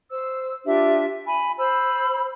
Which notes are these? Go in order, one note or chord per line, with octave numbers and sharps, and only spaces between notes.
C5 E6
D4 F4 G4 E5
G#5 B5
C5 B5 E6